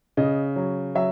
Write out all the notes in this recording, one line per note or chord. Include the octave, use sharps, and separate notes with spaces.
C#3 D#5
F#3
F#3 E5